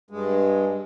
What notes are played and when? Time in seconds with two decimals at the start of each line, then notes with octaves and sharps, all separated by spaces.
0.11 G2 G#3